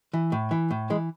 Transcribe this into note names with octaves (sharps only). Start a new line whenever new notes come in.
E3
A2
E3
A2
E3 G#3